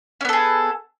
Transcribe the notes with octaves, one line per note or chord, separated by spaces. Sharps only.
B3 C#4 G#4 A4